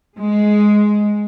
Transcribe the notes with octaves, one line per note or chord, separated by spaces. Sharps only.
G#3